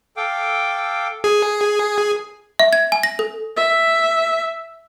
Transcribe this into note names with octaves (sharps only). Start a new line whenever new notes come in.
A4 F5 G5 D6
G#4
E5
G#6
G#5
A#6
A4
E5